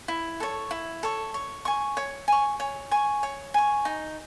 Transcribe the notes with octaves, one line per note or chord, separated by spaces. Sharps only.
E4
A4 C#5
E4
A4 C#5
C#5
G#5 C#6
C#5
G#5 C#6
C#5
G#5 C#6
C#5
G#5 C#6
D#4